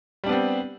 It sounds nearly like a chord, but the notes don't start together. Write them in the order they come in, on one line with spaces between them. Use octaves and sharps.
G3 D4 B3 C4